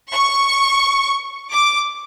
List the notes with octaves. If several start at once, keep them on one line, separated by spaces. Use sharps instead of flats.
C#6
D6